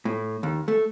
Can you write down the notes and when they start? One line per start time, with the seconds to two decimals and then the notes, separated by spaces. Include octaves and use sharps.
0.05 A2
0.43 D#2
0.68 A3